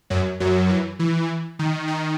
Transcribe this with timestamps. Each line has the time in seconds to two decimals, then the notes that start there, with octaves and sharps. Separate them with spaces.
0.10 F#2 F#3
0.40 F#2 F#3
0.69 E3
0.99 E3
1.59 D#3
1.88 D#3